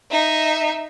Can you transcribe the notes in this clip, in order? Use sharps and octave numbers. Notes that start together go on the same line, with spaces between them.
D#4 E5